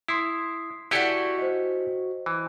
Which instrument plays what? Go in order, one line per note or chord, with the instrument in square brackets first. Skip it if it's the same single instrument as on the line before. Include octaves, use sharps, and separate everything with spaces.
[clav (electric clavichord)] E4 [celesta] C6 D#6 C7
[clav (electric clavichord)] E4 G4 A4 [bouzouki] F#4 G#5 [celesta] D5 C#7
[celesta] C5 D#5
[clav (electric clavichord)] E3